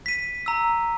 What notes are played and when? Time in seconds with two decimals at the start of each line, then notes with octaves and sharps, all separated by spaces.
0.06 B6 D#7
0.46 A#5 E6